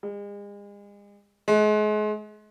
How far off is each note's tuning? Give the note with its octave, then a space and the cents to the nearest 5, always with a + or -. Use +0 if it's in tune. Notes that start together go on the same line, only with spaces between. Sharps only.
G#3 -40
G#3 +35